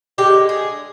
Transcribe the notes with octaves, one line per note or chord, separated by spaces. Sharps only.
D3 G#3 G4
G#4